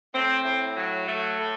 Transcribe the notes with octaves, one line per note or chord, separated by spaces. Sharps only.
A2 C4
A2
F#3
A3
A2